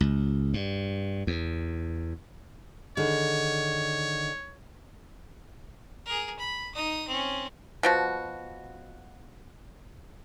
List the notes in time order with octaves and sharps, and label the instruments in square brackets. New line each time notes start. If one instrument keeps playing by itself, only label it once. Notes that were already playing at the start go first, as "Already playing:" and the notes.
[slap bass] C#2
G2
E2
[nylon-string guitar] D3 D#3 G#4 [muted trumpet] C#5
[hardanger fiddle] G#4 A#4
B5
D#4 D#6
C4 C#4
[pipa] B2 F3 F#4